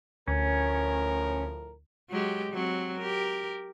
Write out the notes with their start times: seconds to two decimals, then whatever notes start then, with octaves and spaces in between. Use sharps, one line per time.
0.28 D2 A2 F3 C#4 A#4
2.10 F#3 G#3 G4
2.51 F#3 C4
2.98 G4 A#4